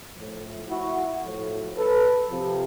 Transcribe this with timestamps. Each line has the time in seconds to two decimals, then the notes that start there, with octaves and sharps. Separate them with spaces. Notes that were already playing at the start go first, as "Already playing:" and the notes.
0.15 A2 F3
0.69 E4 F#4
1.23 A2 F3
1.76 A4 B4
2.30 C3 F3